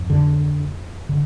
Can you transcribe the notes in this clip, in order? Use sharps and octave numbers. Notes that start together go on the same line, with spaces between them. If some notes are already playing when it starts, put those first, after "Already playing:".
Already playing: F2
D3
D3